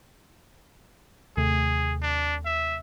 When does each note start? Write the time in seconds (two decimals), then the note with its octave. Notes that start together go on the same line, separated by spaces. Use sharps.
1.37 D#2 C3 A3 G#4
2.03 D4
2.45 E5